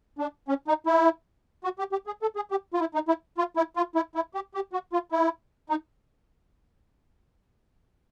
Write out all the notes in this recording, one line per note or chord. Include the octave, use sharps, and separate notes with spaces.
D4
C#4
D#4
E4
F#4
G4
G4
G#4
A4
G#4
G4
F4
E4
D#4
E4
F4
E4
F4
E4
E4
G4
G4
F#4
F4
E4
D#4